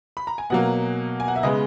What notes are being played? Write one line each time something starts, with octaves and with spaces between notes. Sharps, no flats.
B5
A#5
G#5
B2 F#3 A#3 F#5
G#5
F#5
E5
C#3 G#3 B3 D#5